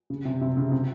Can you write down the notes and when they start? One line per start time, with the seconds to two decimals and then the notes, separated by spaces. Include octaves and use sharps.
0.10 C#3
0.25 C3
0.41 C3
0.57 C#3
0.72 C3